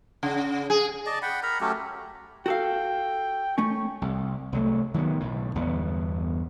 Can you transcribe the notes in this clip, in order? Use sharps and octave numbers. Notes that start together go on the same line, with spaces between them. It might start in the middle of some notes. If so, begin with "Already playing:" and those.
C#3
G#4
D5 D#5 A5
F#5 G5 B5
A#4 A#5 B5
F#3 A3 C#4 G4
F#4 A4 F5 G5
A3 C#4 C#6
C2
C2 F#3 A3
D#3 F#3 B3
B1 A2
G1 E2 B3